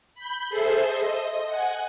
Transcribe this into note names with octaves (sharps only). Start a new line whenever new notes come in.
B5 G6
G#4 A4 C5 E5 C6
D#5
F#5 G#5